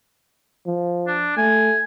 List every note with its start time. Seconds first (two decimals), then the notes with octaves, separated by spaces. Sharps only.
0.67 F3
1.07 D4
1.37 A3 G#5